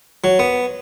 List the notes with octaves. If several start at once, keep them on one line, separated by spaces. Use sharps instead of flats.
F#3
B3